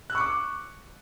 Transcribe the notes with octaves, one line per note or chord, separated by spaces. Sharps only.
C#6 D6 E6 F#6 C#7